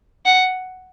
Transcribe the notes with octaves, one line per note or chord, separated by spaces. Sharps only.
F#5